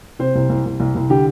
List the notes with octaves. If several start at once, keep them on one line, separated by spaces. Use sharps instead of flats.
C3 C5
C2
C2
C2
C2
C2
D3 G4